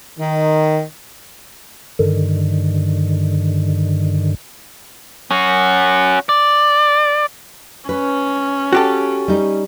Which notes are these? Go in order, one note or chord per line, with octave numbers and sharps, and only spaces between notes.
D#3
G2 D3 D#3
C#4 F#4
D5
C#4 B4
F#4 G4 A4
G3 D#4